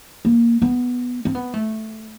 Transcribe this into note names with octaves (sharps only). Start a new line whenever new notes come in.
A#3
B3
C4
B3
A3